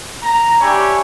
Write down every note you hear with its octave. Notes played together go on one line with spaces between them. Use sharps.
A#5
D4 G4 C#5 E5 G#5 B5